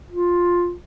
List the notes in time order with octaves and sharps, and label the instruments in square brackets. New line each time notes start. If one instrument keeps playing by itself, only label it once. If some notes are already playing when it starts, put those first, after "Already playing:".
[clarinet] F4